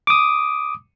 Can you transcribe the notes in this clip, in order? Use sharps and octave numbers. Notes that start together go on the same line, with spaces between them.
D6 D#6